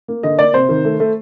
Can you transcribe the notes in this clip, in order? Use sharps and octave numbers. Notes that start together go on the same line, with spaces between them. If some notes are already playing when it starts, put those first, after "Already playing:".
A#3
D3 D#5
A#3 D5
C3 C5
D#3
A3
A3